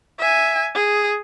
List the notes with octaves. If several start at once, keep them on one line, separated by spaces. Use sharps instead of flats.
E5 G#5
G#4